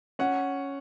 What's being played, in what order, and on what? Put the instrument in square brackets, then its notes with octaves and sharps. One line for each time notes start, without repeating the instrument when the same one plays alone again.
[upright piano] C#4 F#5